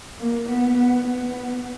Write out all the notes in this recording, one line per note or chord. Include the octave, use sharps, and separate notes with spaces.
A#3
B3
B3
B3